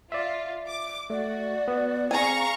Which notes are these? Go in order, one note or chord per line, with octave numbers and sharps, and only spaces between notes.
F4 D5 E5
D6
A3 F#4 D5
B3
C4 G#4 F5 G#5 A#5 C#6